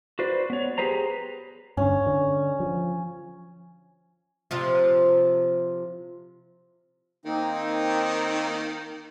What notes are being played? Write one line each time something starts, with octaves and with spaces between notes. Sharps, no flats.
F#4 B4 C5 D5
B3 C#5
G4 G#4 B4 C5 A#5
G2 D3 C#4
D3
F3
C3 F3 F4
D#3 A#3 C4 D#4